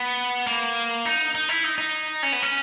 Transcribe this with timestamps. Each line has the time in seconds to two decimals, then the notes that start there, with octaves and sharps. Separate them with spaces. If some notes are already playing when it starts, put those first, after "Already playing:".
Already playing: B3
0.47 A#3
1.05 D#4
1.35 D#4
1.49 E4
1.64 D#4
1.78 D#4
2.23 C#4
2.32 B3
2.42 C#4